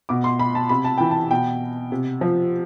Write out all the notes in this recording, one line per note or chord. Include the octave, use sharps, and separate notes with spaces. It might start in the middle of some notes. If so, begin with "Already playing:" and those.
B2 D6
C6
B5
A5
C3 B5
A5
E3 G5
A5
B2 G5
C3
F3